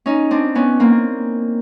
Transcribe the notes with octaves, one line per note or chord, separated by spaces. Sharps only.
C#4 D#4
C4 D4
B3 C#4
A#3 C4